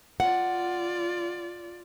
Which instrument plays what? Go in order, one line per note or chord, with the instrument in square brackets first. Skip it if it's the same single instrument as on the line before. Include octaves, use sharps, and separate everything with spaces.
[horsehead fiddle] F4 D5 [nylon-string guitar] F#5